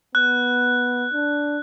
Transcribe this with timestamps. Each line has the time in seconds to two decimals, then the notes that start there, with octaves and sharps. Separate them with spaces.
0.15 B3 F#6
1.13 D4